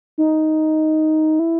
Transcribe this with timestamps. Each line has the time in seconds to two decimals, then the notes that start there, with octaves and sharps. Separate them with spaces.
0.18 D#4
1.39 E4